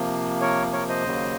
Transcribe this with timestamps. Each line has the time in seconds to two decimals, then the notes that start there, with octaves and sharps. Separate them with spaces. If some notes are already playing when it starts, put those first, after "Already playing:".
Already playing: C3 F3 A#3
0.41 A#4 C#5
0.72 A#4 C#5
0.89 C5 D#5
1.04 D#2 C#3 F#3 A#3